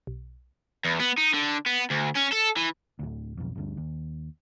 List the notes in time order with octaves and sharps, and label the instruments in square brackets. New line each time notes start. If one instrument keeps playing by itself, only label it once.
[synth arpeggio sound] B1
[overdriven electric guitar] E2
B3
D#4
D3
B3
D2
C#4
A4
E3
[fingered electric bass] D1 D2
B1 F2
G1 D2 G2
D#2